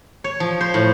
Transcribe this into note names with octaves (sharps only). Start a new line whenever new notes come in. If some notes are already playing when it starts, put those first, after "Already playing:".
C#5
F3
C5
A2